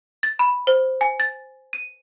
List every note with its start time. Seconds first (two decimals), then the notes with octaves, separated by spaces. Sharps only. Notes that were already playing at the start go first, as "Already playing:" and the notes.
0.23 A6
0.39 B5
0.67 C5
1.01 G#5
1.20 A6
1.73 D#7